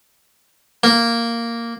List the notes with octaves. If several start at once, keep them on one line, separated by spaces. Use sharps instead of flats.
A#3